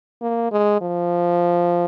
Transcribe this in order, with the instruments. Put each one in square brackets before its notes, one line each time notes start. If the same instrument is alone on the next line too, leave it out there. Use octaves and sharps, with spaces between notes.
[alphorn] A#3
G#3
F3